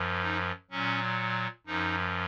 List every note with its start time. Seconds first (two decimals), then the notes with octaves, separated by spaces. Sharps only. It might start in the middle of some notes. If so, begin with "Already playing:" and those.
Already playing: F#2 F3
0.23 D#4
0.71 A#2 F#3 C#4
1.66 F#2 F3 D#4